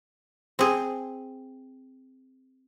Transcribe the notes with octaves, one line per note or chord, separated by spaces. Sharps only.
C4 G#4